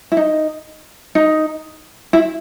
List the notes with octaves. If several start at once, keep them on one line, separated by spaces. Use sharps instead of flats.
E4
D#4
D#4
E4